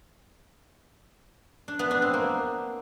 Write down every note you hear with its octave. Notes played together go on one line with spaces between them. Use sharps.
D4
B3
D4
C4
A#3